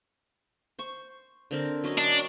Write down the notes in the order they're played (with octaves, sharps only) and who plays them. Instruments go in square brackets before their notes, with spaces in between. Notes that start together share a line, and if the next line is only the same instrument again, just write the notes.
[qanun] C5 C#6
D3 C4 A#4
F#3 C#4 D#5
[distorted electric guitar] D4